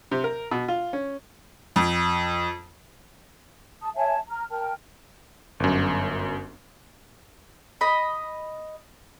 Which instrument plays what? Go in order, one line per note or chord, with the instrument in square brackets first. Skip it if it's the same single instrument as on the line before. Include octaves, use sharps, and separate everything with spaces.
[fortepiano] C3
A#4
B2
F4
C#4
[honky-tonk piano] F2
[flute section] A5 D#6
C#5 E5 G#5 A5
A#5 F6
A#4 G5 A5 F6
[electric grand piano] G1 F#2
[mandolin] D#5 B5